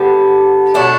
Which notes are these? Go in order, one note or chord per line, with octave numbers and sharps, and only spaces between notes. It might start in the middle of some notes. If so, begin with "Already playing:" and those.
Already playing: D3 G3 B3
B2 F#3 A3 D4